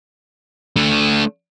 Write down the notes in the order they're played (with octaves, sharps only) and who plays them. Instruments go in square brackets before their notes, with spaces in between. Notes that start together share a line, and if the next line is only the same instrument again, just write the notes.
[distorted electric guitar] A3 D4